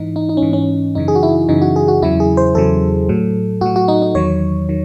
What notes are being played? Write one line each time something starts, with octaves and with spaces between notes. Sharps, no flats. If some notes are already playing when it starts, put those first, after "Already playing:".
Already playing: G#2 E3 D#4
D#4
D#4
C#4
G#2 E3
C#4
F#2 C#3 E3 D#4
G#4
F#4
E4
F#2 C#3 E3 D#4
F#4
G#4
F#4
E2 C#3 F#3 E4
G#4
C5
E2 C#3 F#3 A4
A2 F#3
A2 F#3 F#4
F#4
D#4
D#4
E2 D#3 F#3 C#5
D#3 F#3